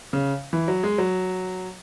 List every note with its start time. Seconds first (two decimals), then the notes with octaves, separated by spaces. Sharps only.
0.13 C#3
0.53 E3
0.68 F#3
0.83 G#3
0.98 F#3